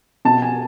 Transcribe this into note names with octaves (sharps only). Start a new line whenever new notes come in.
B2 A5
G#5